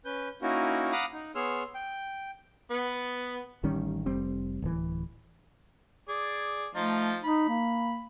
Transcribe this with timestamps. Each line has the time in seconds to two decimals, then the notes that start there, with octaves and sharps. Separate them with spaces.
0.05 C#4 B4 G6
0.42 A#3 C#4 D#4 E4 F#4 A#4
0.92 F5 F#5 A#5 B5 D6 D#6
1.13 D#4
1.35 B3 G#4 C#5 C6 E6 F6
1.75 G5
2.71 B3
3.63 A1 D#3 G3 C#4
4.06 F1 G3 C4
4.62 D1 E3
6.09 G#4 D5
6.75 F3 A3 D#4 F4
7.24 D#4 B5
7.49 A#3